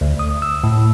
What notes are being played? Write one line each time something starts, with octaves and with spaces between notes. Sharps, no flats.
D2
D#6
E6
A2